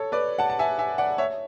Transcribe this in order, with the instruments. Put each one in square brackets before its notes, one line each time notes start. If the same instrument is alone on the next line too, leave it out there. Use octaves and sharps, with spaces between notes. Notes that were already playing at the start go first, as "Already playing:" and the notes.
Already playing: [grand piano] A4 C#5
B4 D5
F#5 A5
A5
E5 G#5
E5 G#5
D5 F#5
C#5 E5